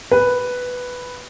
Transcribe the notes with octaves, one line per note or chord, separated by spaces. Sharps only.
B4